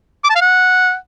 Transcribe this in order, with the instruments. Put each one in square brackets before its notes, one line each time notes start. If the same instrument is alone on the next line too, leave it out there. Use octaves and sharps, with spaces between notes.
[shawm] D6
A5
F5
F#5